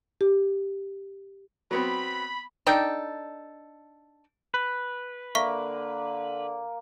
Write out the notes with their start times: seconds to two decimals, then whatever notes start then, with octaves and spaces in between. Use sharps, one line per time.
0.21 G4
1.71 F#3 B3 C4 B5
2.67 D4 D#4 A4 G5
4.54 B4
5.35 D3 A#3 E5 C#6 B6